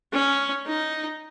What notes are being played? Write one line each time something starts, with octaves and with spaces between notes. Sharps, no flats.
C#4
D#4